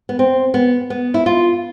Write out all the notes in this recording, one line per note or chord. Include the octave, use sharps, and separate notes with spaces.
B3
C4
B3
B3
E4
F4